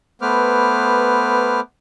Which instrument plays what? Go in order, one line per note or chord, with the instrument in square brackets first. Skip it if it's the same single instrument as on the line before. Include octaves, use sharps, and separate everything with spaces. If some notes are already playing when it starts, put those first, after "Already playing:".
[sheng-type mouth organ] A3 B3 B4 C5 D6 F6